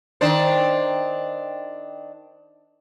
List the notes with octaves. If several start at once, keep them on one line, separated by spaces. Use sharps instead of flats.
D#3 D4 C5